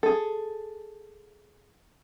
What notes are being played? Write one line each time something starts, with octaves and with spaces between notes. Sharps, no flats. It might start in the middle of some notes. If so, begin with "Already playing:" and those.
G#4 A4